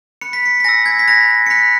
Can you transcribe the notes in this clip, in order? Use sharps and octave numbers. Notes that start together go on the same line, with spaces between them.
B5 F#6 C#7
B6
C#7
B6
G#5 B5 E6 A#6
G#6
B6
B5 F#6 A#6
C#7
B5 F#6 B6